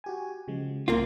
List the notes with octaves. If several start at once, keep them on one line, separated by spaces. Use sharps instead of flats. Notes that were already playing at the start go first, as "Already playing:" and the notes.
F#4 G4 G#5
C#3 F3 G#3
C2 G#2 G#3 A#3 C4 F4